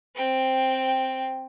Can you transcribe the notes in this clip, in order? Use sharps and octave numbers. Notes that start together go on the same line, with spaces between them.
C4 G5